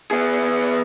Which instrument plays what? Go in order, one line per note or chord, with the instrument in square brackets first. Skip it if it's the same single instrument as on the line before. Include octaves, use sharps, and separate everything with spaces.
[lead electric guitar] B3 G#4